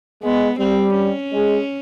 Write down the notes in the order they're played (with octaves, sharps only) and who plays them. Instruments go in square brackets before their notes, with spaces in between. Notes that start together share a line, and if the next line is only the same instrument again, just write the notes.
[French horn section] G#3 [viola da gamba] B3
[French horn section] G3 [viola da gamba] C4
[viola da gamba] C#4
[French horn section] G#3